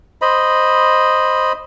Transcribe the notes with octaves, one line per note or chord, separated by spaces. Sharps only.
C5 D#5 B5